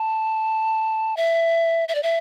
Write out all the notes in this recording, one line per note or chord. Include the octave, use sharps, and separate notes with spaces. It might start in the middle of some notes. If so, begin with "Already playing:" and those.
Already playing: A5
E5
E5
D5
E5